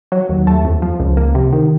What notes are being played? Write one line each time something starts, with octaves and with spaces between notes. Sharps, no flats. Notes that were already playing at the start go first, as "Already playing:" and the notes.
F#3
D#2
A3
F2
F3
C#2
A#3
C3
D#3